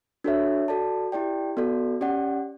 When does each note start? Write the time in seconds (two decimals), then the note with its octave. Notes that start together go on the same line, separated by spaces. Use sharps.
0.24 D4 F#4 A4 C#5 E5
0.68 F#4 A4 D5 A5
1.12 E4 G4 D5 G5
1.57 B3 F#4 A4 D5
2.01 C#4 G4 D5 F#5